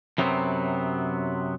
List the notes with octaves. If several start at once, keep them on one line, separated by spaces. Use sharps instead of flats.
F#2 C3 F#3 B3 C4